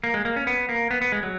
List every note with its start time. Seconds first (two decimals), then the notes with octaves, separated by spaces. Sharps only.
0.04 A#3
0.14 G#3
0.25 A#3
0.36 C#4
0.47 B3
0.69 A#3
0.91 B3
1.01 B3
1.12 G#3
1.23 F#3